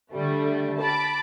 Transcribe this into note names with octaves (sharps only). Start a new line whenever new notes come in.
D3 G3 A3
A5 B5 D6